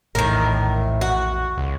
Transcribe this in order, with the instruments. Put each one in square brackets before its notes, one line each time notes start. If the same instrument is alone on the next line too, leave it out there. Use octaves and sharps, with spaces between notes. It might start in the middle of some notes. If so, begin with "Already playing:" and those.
[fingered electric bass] A#1 E2 [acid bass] A2 [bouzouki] D#3 A#4
[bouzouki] F#4
[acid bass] C#2